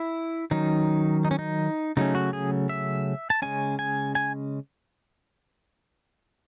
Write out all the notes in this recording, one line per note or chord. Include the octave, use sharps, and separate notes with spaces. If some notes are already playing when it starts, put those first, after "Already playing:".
Already playing: E4
D#3 F#3 C#4 D#4
D#4
C#4
D#4
C#3 F#3 A3 C#4 D#4
F#4
G#4
E5
A5
C#3 G#3 C#4 G#5
G#5
G#5